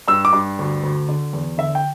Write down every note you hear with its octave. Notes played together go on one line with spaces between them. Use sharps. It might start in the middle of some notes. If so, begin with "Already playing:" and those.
G2 E6
D6
G2
D2
D2
D3
E2
D3 E5
G5